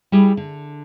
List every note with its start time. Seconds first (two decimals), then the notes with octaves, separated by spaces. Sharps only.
0.12 G3 E4 G4 G#4
0.37 D3